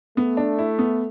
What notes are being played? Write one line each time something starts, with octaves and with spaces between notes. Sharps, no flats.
A3 B3
D4
E4
B3